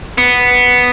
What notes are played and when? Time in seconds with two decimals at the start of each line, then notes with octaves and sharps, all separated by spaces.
0.18 B3